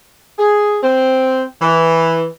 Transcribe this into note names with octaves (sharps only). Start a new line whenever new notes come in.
G#4
C4
E3